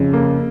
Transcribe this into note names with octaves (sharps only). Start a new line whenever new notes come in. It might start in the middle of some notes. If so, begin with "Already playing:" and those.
Already playing: F2 C#3
A#3